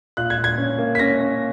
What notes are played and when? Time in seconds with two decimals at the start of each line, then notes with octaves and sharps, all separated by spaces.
0.17 A#2 F#6
0.30 G#6
0.37 A#2
0.44 G#6
0.58 C#4
0.78 A#3
0.95 B6
0.99 C#4 A#6
1.20 C#4